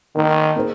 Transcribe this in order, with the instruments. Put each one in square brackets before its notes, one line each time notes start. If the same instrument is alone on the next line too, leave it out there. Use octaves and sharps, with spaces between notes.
[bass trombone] D#3 [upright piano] A#3 D#4 A#4
[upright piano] A#3 D#4 G#4 C5